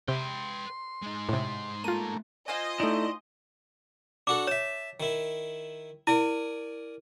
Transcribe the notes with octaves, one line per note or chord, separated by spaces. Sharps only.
C3 B4 G5 C6
G#3 D#4
A2 C3
A3 A#3 F4 D#7
F4 C5 D#5 G#5
A3 D#4 E4 D5
D4 F#4 A4 D6
C#5 E5 A5
D#3 E4
E4 A#4 D5 G#5